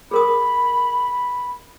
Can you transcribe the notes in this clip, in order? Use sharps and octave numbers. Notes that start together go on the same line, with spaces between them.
G#4 A#4 B5 D#6